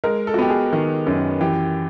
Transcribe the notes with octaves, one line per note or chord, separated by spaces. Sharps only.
G#3 A#4
A4
F#4
B3 G4
G#4
D#3
F#2
E3 G4